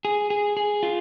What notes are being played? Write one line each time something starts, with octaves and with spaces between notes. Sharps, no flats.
G#4
G#4
G#4
F4